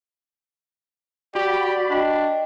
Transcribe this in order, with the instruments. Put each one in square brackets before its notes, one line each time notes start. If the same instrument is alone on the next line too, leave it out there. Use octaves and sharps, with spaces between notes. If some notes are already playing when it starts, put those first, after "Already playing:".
[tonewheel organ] F#4 B5 [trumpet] G4 [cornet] D5
[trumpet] D4 [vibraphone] D#5 G5